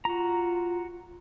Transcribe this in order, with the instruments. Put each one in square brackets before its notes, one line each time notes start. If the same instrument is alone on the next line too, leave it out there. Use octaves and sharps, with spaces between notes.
[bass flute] F4 [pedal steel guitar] F#4 A#5